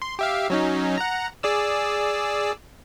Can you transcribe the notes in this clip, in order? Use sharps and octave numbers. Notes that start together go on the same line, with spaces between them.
C6
G4 E5 F5
F#3 C#4 D#4
F#5 A#5
G#4 D5 E6